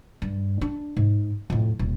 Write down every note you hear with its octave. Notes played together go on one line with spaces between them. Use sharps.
G2
D4
G#2
F2 A2
D#1